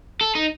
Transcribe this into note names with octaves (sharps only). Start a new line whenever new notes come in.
A4
D#4